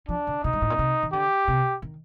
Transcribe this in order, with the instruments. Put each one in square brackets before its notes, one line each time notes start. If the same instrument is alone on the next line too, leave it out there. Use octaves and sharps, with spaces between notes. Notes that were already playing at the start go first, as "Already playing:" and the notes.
[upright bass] F3 [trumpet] D4
[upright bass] D3
[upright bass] C3 [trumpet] D#4
[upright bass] G2
A2
A#2
C3
D#3
[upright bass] D3 [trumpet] G4
[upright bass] C3
D#3